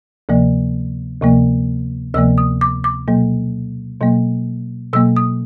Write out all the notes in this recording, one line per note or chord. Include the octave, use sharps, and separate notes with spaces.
D2 C3 F3 A#3
D2 C3 F3 A#3
D2 C3 F3 A#3 E6
D#6
D6
D6
B2 F#3 A#3
B2 F#3 A#3
B2 F#3 A#3 E6
D#6